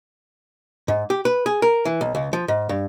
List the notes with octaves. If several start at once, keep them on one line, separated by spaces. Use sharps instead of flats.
G#2
G4
B4
G#4
A#4
E3
B1
C#2
F3
G#2
G2